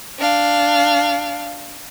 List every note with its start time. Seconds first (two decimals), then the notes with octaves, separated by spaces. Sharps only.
0.19 D4 F5